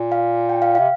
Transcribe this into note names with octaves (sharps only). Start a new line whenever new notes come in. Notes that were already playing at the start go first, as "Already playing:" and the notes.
Already playing: A#2
F5
G5
F5
C3 F5